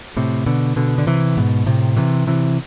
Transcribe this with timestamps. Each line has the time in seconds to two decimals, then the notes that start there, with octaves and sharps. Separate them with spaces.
0.17 A2 C3
0.46 B2 D3
0.76 B2 D3
0.98 D3
1.07 C3 E3
1.37 G#2 B2
1.66 A2 C3
1.97 C3 E3
2.27 C3 E3